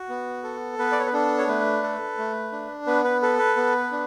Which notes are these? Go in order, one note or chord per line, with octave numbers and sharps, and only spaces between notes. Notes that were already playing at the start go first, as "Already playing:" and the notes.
Already playing: F#4
B3
A4
B3 B4
D5
C#5
B4
D4 A4
C#5
A3 B4
A4
A3
D4
B3 B4
B4
A4 B4
B4
B3
D4